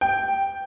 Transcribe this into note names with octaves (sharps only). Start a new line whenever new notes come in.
G5